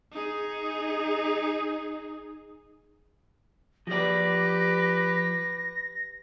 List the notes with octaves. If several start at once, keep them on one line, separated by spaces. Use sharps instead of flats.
D#4 G#4
F3 G4 B4 D5 A#6